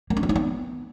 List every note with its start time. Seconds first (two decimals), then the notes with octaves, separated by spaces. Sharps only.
0.10 A#3
0.17 C#4
0.23 F4
0.29 D#4
0.36 B3